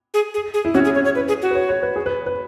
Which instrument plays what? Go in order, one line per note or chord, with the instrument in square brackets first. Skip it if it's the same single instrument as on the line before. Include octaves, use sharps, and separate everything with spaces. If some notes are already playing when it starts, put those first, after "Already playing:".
[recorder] G#4
G#4
G#4
[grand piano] E4
[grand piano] C#4 [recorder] F#4
[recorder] G#4
C#5
C#5
B4
G#4
F#4
[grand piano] B4
C#5
C#5
B4
G#4
B4
B4